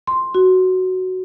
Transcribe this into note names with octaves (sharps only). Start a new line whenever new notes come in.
C6
F#4